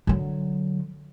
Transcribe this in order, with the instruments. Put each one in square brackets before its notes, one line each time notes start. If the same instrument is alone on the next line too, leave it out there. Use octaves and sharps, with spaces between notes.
[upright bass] D3 F#3